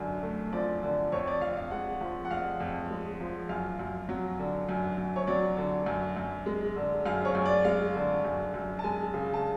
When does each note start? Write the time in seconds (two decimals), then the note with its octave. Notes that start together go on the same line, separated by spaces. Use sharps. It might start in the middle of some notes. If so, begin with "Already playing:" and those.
Already playing: F#2 D3
0.23 A3
0.53 F3 D5
0.83 D3
1.12 F2 C#5
1.27 D5
1.41 F2 F5
1.57 F5
1.71 G#3 F#5
2.01 F3
2.25 F#5
2.31 F2 F5
2.60 F2
2.90 G#3
3.20 F3
3.49 F#2 F5
3.79 F#2
4.09 F#3
4.39 D3
4.69 F#2
4.97 F#2
5.16 C#5
5.27 F#3 D5
5.57 D3
5.86 F#2
6.16 F#2
6.46 G#3
6.76 D3
7.06 F#2 F5
7.25 C#5
7.35 F#2
7.45 D5
7.65 G#3 F5
7.95 D3
8.24 F#2
8.54 F#2
8.79 A5
8.84 G#3 G#5
9.14 C#3
9.34 A5